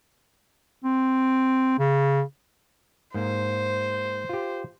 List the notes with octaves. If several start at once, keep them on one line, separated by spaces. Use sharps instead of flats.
C4
C#3
G#2 A#3 C5
F4 G4